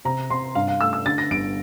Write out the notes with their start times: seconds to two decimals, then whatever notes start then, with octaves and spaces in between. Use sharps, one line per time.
0.05 C3 A#5
0.30 C3 C6
0.55 G2 F5
0.68 F5
0.81 A3 E6
0.93 E6
1.06 D3 A6
1.18 A#6
1.31 G1 D7